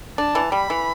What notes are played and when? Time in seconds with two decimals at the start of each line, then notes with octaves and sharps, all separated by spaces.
0.18 D4 A5
0.35 E3
0.52 G3 B5
0.70 E3